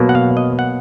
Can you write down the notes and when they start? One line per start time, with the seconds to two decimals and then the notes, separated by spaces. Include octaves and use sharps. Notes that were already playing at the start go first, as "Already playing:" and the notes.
Already playing: B2 F#3 A#3
0.09 F#5
0.15 F5
0.37 D#5
0.59 F#5